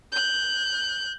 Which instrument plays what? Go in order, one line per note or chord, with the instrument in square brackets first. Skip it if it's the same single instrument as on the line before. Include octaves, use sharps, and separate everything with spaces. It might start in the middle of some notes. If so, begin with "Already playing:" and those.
[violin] F#6 G6